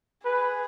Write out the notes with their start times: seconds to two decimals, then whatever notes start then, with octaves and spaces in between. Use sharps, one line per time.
0.24 G#4 B4